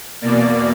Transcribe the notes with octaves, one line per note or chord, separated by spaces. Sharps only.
E2 B2 A#3 D5